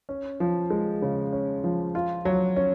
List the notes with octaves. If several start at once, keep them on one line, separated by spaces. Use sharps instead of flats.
C#4
F3
G#3
C#3
C#4
F3
F4
F#3
C#4